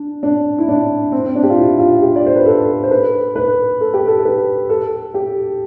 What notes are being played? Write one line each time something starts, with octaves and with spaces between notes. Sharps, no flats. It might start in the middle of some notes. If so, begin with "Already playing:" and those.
Already playing: D4
D4
E4
D4
C4
C4
D4
G4
F4
E4
F4
G4
D5
C5
B4
A4
C5
B4
B4
A4
G4
A4
B4
A4
G4